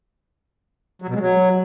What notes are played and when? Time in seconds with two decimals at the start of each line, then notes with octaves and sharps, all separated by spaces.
1.02 F#3
1.08 B2
1.15 G#3
1.21 F#3